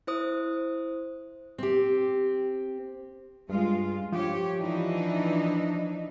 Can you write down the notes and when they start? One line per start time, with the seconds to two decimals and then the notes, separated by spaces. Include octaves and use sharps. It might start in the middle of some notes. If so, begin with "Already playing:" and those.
0.07 E4 C5 D#6
1.58 C4 G4
3.50 G2 G#3 F4
4.12 F3 G4 C#5
4.56 E3 D4 D#4